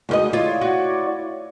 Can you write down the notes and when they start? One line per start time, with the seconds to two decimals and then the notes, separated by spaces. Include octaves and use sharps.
0.09 D2 G#3 F4 F#4 D#5
0.33 E4 F4 C#5 D5
0.61 F#4